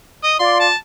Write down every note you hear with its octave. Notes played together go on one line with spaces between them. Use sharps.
D#5
F4 D5 C6
A5